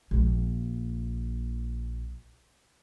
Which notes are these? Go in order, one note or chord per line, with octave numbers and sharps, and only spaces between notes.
A#1 A#3